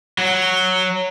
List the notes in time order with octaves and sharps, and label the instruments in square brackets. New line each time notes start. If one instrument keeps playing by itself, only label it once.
[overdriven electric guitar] F#3